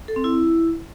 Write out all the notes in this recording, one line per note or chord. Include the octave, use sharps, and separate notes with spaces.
A4
C4
E4